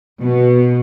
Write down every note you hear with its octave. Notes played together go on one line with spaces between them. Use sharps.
B2